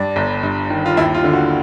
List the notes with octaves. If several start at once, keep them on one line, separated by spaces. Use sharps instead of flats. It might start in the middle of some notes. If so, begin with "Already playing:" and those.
Already playing: G2 D4
G1
G2
D#3
F4
D#2 E4
F4
D3
F#4